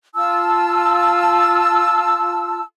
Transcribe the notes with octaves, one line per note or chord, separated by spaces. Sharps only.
F4 A5 E6